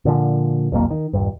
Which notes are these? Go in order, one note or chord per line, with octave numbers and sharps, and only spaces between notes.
A#2 D3 F3
D#1 B1 F2 A#3
D#3
D#1 B1 G2